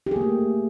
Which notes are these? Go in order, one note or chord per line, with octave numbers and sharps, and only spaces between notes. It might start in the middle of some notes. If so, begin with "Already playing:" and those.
A3 A#3 G4 G#4